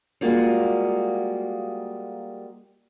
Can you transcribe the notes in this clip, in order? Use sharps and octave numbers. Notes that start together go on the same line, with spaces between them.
G3 G#3 A#3 F4 F#4 G#4